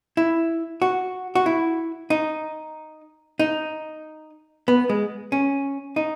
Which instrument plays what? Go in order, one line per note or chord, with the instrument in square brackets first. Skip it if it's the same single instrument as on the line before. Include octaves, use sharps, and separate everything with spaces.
[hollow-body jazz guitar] E4
F#4
F#4
E4
D#4
D#4
B3
G#3
C#4
D#4